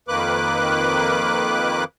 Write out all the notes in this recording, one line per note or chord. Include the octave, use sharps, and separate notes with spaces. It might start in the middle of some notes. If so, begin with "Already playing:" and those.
F2 D#3 A#3 B4 D6 F#6